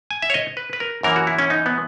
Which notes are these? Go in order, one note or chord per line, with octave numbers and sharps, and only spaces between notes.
G#5
E5
C#5
D#5
B4
B4
A#4
F#2 E3 A#3 A#4
F#4
E4
C#4
D#4
B3